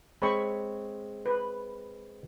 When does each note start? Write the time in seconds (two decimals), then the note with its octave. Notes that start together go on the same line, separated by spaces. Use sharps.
0.22 G#3 C4 C#5 B5 C#6
1.26 B4